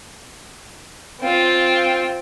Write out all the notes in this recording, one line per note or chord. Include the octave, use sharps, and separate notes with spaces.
C4 F4